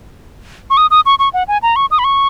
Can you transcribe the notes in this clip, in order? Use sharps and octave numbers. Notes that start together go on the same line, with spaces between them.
C#6
D#6
D#6
C#6
C#6
F#5
G#5
A#5
C#6
D#6
B5
C#6